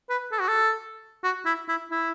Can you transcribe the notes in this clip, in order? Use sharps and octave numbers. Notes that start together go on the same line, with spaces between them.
B4
A4
F#4
A4
F#4
E4
E4
E4